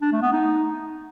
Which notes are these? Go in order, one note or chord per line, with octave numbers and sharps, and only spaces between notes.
D4
A3
B3
D#4